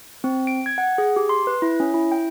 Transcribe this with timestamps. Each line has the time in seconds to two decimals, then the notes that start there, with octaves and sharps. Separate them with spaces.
0.24 C4
0.47 D7
0.66 G#6
0.78 F#5
0.98 G#4
1.16 G4
1.29 C6
1.47 B4
1.62 E4
1.80 C#4
1.94 E4
2.12 G5